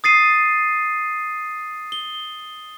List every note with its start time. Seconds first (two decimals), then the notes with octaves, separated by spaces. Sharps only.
0.04 D#6 A6 C7 D#7
1.92 G7